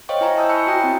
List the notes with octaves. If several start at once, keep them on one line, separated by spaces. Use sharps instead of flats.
C5 C#5 D#5 F5 G5 C#6
E4 G#5 A#5
A5 D#6 E6 G6
B5 C#6 E6 F#6 G6 C#7
E4 F#4 G5 D#6
C4